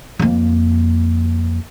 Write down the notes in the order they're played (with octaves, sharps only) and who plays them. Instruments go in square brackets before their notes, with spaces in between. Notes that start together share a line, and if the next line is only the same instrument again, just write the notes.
[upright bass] F2 A#3